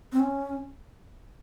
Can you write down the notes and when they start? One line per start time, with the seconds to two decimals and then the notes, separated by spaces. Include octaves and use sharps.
0.12 C4
0.20 C#4